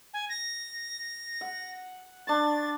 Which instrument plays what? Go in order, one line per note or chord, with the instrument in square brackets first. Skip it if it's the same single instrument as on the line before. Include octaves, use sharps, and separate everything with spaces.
[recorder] G#5
A#6
[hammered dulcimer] F#5
[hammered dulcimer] D4 C#6 [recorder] A6